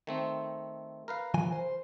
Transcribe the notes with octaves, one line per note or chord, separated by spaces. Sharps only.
D#3 A3 C4
A#4 B4 F5
E3 F3 G#5
C5